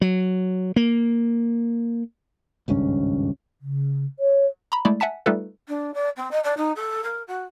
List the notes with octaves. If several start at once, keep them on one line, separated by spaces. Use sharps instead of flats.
F#3
A#3
G#1 C#2 G2 C#4
C#3
C#5
A#5 B5
G#3 A3 E4 D5
E5 F#5 G#5 A5 B6
G3 A3 D#4 F4 A4 B4
D4
D5
C4
D#5
D5
D#4
A4
A#4
F#4